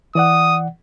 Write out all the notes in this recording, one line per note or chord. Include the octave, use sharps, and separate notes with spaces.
E3 D5 F#5 D#6